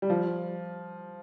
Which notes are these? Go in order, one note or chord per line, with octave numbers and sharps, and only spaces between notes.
G3
F3